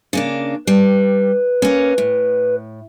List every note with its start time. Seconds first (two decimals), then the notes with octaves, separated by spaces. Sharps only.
0.13 C#3 A#3 D4
0.67 G3 B4
1.62 A#3 C#4
1.98 A2